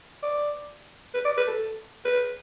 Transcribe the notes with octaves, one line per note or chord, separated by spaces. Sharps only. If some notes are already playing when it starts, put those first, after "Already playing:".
D5
B4
D5
B4
A4
B4